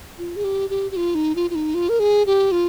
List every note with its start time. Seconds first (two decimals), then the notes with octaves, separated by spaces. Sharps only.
0.18 F4
0.36 G#4
0.44 G4
0.70 G4
0.91 G4
0.96 F4
1.15 D#4
1.36 F4
1.50 F4
1.55 D#4
1.74 F4
1.89 A#4
2.00 G#4
2.27 G4
2.52 F4